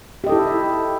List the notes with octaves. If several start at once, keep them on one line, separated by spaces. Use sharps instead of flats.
E4 G4 A4 D#5